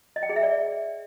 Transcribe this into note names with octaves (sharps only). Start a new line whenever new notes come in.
D#5
G5
G#4
E5
D5